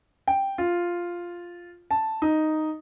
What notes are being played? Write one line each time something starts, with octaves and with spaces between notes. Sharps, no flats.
G5
F4
A5
D#4